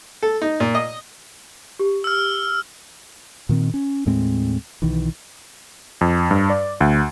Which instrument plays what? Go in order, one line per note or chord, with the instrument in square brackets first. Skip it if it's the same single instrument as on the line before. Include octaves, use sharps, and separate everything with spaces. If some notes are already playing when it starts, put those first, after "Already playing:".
[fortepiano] A4
D#4
A#2
D#5
[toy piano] G4
[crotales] E6 F6
[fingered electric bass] A#2 D#3 C4
C#4
D#2 A2 G#3 C4
B1 D#3 E3
[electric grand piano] F2
G2
D5
D2